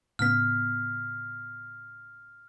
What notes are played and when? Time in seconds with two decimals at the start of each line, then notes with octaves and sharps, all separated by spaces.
0.19 A2 C#3 B3 F6 B6